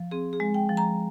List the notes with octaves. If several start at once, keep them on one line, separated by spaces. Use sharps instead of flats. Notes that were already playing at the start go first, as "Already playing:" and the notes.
Already playing: F3
C4 G#4
G#4
G#3
G5
F3
A#5